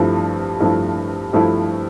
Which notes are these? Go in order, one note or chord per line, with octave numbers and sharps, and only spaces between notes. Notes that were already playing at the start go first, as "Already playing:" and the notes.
Already playing: G2 F3 A3 E4
G2 F3 A3 E4
G2 F3 A3 E4